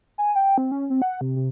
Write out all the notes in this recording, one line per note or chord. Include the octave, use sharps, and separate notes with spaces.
G#5
G5
C4
C#4
C4
F#5
C3
C3